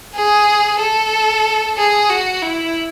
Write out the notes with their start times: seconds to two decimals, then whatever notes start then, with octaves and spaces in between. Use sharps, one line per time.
0.15 G#4
0.80 A4
1.77 G#4
2.10 F#4
2.42 E4